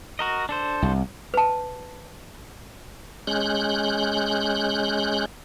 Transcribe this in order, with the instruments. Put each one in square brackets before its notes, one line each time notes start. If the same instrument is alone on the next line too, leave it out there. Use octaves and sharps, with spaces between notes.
[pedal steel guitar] F#4 A#4 D#5
D4 A4 C5
[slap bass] C2
[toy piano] B4 A5
[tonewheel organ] G#3 C#4 F#6 G6